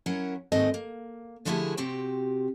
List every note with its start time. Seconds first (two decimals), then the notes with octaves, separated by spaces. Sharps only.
0.06 F#3 C#4 E4 A#4 F#5
0.52 D#2 G#2 D#3 A3 C4 D#5
0.74 A#3
1.45 D3 F3 A3 E4 G4 G#4
1.77 C3 C4 F#4 G4 G5